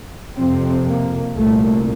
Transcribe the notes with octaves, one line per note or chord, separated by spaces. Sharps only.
F2 C3 C4
A#3
C2 A#2 A3